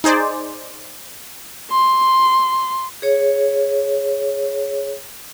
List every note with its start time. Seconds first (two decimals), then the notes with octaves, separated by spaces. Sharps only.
0.04 D#4 G#4 C5 D5
1.71 C6
3.02 G#4 C#5